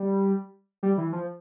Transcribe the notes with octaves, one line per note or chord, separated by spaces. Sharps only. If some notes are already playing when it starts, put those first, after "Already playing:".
Already playing: G3
G3
E3
F3